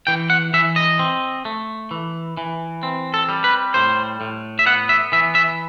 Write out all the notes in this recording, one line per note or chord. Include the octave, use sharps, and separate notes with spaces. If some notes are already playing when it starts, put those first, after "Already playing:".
E3 G5
F#5
E3 E5
D#5
C4
A3
E3
E3
C4
A4
G3
B4
A2 C5
A2
E5
B3 F#5
E5
E3 E5
E5